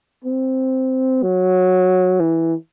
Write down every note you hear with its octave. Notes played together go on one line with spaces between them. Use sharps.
C4
F#3
E3